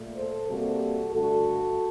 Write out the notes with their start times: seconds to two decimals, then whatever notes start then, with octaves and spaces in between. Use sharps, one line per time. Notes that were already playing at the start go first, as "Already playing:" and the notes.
Already playing: A#2 A3
0.16 A4 C5
0.47 C3 G3 A#3 F#4 A4
1.11 G2 D3 A3 F#4 A4